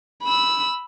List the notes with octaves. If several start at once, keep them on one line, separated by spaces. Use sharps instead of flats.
B5 E6